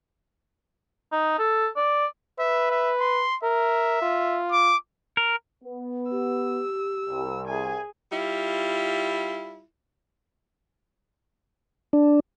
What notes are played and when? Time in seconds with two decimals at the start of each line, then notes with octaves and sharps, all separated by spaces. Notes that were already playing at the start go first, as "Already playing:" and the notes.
1.12 D#4
1.39 A4
1.77 D5
2.39 B4 E5
2.71 E5
3.00 C6
3.43 A#4 E5
4.02 F4
4.51 D6
5.17 A#4
5.64 B3
6.11 G4 E6
7.09 C2
7.47 G#4 G#5
8.13 G3 E4 F4
11.93 D4